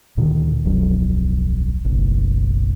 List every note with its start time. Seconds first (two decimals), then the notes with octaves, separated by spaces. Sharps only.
0.17 D2 A#2 D3 D#3
0.64 D1 B1 F2 F#3
1.85 F#1 B1